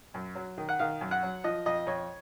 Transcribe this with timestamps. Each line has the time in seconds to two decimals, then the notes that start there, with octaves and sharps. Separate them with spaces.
0.14 F#2
0.35 F#3
0.58 D#3
0.69 F#5
0.79 D#3 F5
1.01 F#2
1.11 F#5
1.23 F#3
1.44 F3 D#5
1.66 F2 D#5
1.86 F2 C#5